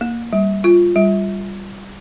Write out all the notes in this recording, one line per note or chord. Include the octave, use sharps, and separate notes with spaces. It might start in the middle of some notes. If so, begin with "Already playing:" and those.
A#3
G3
F4
G3